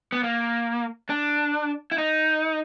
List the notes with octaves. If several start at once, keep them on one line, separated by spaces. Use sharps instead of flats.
B3
A#3
D4
E4
D#4